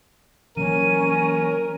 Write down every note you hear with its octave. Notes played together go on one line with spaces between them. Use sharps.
E3 F#3 A#3 C#4 A#4 D#7